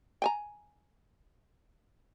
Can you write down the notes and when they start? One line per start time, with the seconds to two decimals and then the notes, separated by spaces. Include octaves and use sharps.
0.22 G5 G#5 A#5